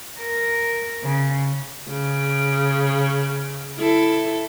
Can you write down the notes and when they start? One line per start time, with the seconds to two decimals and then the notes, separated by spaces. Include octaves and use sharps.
0.20 A#4
1.04 C#3
1.88 C#3
3.79 E4 A4